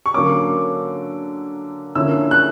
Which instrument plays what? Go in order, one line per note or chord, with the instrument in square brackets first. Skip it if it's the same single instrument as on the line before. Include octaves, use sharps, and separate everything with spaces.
[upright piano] C#6
D3 F#3 A#3 C#4 D6
D3 F3 A#3 C#4 E4 E6
F#6